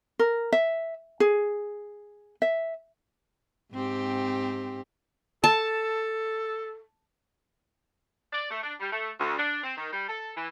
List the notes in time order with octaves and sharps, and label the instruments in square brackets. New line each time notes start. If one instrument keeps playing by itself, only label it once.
[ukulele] A#4
E5
G#4
E5
[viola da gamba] G#2 C4 G4
[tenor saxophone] A4 [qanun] A5
[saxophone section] D5
A3
D4
G3
A3
D2
D4
C4
D#3
G3
A4
E3